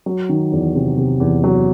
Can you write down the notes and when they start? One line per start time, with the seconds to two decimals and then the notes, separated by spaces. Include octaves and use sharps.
0.06 F#3
0.29 D#3
0.52 E2
0.75 C3
0.97 C3
1.20 E2
1.44 F#3